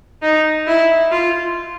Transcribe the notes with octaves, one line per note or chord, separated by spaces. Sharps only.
D#4
E4
F4